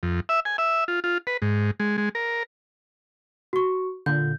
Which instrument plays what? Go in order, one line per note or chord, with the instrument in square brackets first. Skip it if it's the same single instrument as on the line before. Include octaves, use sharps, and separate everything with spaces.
[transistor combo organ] F2
E5
G#5
E5
F4
F4
B4
G#2
G#3
G#3
A#4
[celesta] F#4 C#6
[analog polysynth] A#2 D3 [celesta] G6